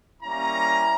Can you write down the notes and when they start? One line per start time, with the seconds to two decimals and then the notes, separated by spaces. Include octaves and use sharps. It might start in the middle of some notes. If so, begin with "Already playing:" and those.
0.22 G3 A#3 C#4 E4 A#5